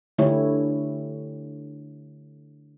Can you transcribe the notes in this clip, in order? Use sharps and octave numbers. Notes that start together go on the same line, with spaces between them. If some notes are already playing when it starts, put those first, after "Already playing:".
D3 A3 E4 G4 C#5